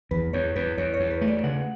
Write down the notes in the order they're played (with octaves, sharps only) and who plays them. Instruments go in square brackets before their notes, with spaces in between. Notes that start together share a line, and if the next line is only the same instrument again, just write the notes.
[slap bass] E2 [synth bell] B4
[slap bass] E2 [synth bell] C#5
[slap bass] E2 [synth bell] B4
[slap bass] E2 [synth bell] C#5
[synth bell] C#5
[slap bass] E2
[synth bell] B4
[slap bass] A3
[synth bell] D5
[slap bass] C#3 [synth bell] F#5